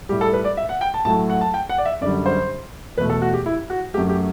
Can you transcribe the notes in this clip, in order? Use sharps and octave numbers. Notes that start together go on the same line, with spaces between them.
A2 G3 G4
A4
B4
D5
E5
F#5
G5
A5
A2 F#3 A3 A5
F#5
A5
G5
F#5
D5
E5
F#2 D3 G3 D5
C5
E2 B2 A3 B4
A4
F#4
G4
E4
F#4
F#2 F#3 A3 G4
G4